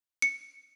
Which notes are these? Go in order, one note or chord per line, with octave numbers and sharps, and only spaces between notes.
C#7